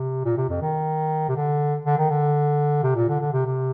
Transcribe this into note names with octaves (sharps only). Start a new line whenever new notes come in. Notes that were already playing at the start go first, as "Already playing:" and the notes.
Already playing: C3
A#2
C3
F2
D#3
C3
D3
D3
D#3
D3
C3
A#2
D3
D3
C3
C3